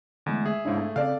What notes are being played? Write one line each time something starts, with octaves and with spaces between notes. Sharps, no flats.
E2 D3 G#3 A3
G#4 E5
G#2 C#3 D4 E4
A3
C#3 C4 A4 D5 F5